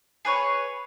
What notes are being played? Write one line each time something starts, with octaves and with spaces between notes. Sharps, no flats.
G#4 B4 C#5 C#6